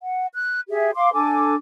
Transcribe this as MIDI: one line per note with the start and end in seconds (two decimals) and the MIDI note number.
0.04 0.27 78
0.33 0.60 90
0.70 0.91 67
0.70 0.91 68
0.70 0.91 76
0.95 1.12 77
0.95 1.12 84
0.95 1.12 86
1.14 1.55 62
1.14 1.55 69
1.14 1.55 80
1.14 1.55 86